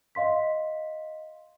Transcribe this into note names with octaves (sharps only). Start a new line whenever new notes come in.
D#5 F5 C6 B6